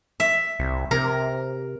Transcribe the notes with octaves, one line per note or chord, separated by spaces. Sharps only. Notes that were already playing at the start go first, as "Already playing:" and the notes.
E5
C2
C3 A#4